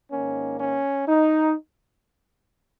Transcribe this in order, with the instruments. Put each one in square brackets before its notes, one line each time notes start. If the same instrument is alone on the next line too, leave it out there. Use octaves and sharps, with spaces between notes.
[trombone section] G#2 D#3 A#3 C#4
C#4
D#4